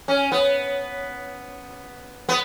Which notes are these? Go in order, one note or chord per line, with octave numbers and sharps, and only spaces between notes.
C#4
B3
B3